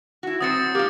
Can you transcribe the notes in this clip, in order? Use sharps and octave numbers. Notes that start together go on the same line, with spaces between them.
E4 F#4
F#3 C4 C5 D#6 A6 C#7
A#3 F4 G4